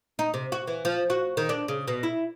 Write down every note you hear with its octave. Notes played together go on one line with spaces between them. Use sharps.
D#4
C3
F#4
E3
F3
F#4
D#3
D4
C#3
B2
E4